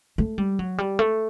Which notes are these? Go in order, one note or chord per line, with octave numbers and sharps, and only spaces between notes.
A3
G3
F#3
G3
A3